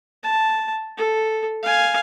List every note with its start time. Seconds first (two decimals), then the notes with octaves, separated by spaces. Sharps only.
0.23 A5
0.98 A4
1.63 F5 G#5